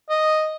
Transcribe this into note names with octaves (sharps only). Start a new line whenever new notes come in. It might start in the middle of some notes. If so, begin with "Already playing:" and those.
D#5